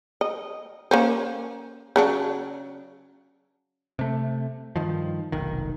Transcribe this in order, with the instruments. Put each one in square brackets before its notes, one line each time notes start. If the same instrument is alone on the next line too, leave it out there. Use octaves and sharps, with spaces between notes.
[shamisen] D#5
A#3 C#4 C5
C#3 F#3 D4
[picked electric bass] C3 A3
G2 D#3 F3
F1 B1 D#3